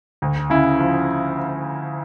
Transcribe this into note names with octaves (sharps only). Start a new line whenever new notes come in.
D2
C#3 E4
F3